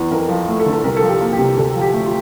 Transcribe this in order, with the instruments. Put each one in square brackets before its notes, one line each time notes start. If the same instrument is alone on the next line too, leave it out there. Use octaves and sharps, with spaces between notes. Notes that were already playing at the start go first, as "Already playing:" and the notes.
Already playing: [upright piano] E2
F2 A#4
F3
A3
A4
D3
A4
C2 A#4
A4
F3
G4
A#3
G4
C3
D2 A4
F3
G4
A3
F4